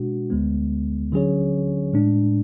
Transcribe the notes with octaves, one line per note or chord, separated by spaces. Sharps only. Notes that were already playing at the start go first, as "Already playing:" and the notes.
Already playing: B2 G#3 D4 F#4
D2 D3 G#3 B3
D3 F#3 C#4 G#4 C#5
A2 G#3 D4